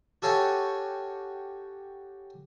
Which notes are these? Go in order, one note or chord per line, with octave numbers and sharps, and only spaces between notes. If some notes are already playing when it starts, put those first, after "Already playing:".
F#4 G4 A4 C#5 F5 G#5